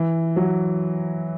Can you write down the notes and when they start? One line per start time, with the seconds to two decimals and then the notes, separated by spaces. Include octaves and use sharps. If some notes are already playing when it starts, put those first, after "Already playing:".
Already playing: E3
0.36 F#3